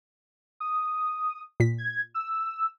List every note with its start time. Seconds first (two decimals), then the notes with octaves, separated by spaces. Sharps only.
0.60 D#6
1.60 A#2 B6
1.78 G#6
2.14 E6